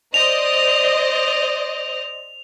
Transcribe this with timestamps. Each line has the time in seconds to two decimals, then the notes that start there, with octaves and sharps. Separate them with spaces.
0.14 C5 D5 D#5 F7